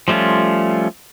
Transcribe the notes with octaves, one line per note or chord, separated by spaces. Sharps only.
F3 G3 A3 C#4 F4